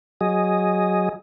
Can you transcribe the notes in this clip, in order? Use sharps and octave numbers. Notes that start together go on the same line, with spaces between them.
F#3 G#4 D#5